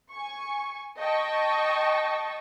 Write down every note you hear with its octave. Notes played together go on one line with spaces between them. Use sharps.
G#5 C#6
D#5 G5 A5 C#6